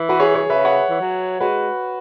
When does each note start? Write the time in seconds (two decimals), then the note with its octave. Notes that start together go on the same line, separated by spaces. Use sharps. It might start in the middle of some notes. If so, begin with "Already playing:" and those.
Already playing: E3
0.09 F#4 B4
0.19 G#4 C#5
0.34 G#4 C#5
0.50 C#3 B4 E5
0.65 C#5 F#5
0.90 E3
1.01 F#3
1.40 G#3 F#4 B4